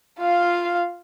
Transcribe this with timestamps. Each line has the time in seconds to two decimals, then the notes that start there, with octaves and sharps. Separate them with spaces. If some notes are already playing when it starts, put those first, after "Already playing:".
0.20 F4 F5